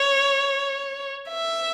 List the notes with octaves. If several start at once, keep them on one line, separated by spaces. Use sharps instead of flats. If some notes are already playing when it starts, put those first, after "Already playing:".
Already playing: C#5
E5